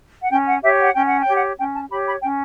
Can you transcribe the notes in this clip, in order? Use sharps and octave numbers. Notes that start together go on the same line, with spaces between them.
F#5
C#4 G5
F#5
G4 C#5 E5
F#5
C#4 G5
F#5
G5
G4 C#5
F#5
C#4 G5
A5
G4 C#5 B5
B5
C#4 G5